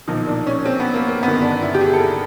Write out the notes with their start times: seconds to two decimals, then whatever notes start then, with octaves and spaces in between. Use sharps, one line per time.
0.08 B1 A#2 F3 D#4
0.27 D4
0.47 C#4
0.65 C4
0.80 B3
0.94 A#3
1.08 A#3
1.23 G1 F#2 D#3 B3
1.42 D4
1.62 E4
1.74 G4
1.81 G#4
1.93 A4
2.00 A#4